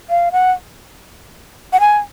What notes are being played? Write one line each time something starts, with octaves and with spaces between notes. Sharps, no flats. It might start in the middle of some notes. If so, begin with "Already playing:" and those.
F5
F#5
F#5
G#5